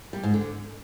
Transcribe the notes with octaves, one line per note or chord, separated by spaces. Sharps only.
G3
G#2
D3